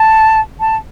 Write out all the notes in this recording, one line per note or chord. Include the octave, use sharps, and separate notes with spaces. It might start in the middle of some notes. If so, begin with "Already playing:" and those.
Already playing: A5
A5